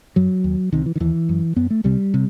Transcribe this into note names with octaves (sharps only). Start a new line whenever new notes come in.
F#2 F#3
D#2
C2 C3 D#3
E3
D#3
D#2 E3
F#2
F#2 B3
A3
C2 C3 G3
C3